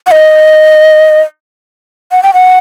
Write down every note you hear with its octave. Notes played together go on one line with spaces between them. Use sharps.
F#5
D#5
F#5
G5
F#5